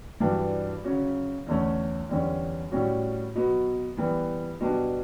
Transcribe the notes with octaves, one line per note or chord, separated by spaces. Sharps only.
G2 E3 G3 D4 F#4
C#3 F#3 C#4 F#4
E2 D3 A3 C#4
E2 D3 G3 C#4
A2 G3 C#4 F#4
B2 F#3 B3
E3 G3 B3
B2 G3 D4